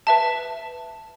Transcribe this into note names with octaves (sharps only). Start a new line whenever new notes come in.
B4 E5 A5